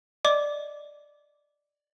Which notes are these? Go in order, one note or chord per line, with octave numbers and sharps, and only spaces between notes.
D5 D#5 D6